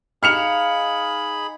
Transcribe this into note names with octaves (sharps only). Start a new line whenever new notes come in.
D#4 G#4 F5 B5 F6 C#7 F7